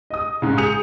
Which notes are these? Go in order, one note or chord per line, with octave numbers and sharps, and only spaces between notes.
D#5 D#6
G#2 C#3
G#4 D#6 G6 C#7 F7